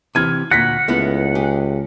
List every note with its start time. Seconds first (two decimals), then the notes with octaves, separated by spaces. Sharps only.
0.15 C3 E3 F6 G#6 D#7
0.51 D2 A#2 F#5 A#6 B6
0.88 C#2 A3 B3 E4
1.35 G4 G#4